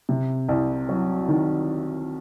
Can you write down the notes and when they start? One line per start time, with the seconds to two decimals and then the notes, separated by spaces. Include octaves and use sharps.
0.09 C3
0.49 C2
0.89 F#3
1.29 D#3